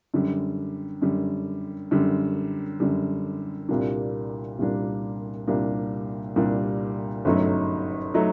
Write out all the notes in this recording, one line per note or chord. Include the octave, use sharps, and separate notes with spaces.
F#2 D3 G3
F#2 D3 G3
F#2 D3 G3
F#2 D3 G3
C2 A#2 G3 A#3 D4
C2 A#2 G3 A#3 D4
C2 A#2 G3 A#3 D4
C2 A#2 G3 A#3 D4
G1 F#2 F#3 A3 D#4
F#3 A3 D#4